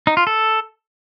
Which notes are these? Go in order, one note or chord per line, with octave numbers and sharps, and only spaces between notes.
D#4
F4
A4